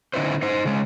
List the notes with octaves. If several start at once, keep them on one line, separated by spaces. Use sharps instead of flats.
D3 C#4 D#4 E4 B4 C5
D#4 C5
C#3 G#3